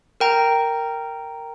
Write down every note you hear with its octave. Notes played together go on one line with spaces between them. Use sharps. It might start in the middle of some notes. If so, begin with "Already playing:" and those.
A#4 G5 A#5